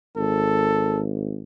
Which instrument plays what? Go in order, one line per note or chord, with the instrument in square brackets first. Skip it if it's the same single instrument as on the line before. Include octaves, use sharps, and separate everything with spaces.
[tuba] G#1 [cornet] A4